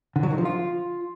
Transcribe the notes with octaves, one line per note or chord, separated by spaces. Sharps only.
D3
F#3
D#3
F3
F4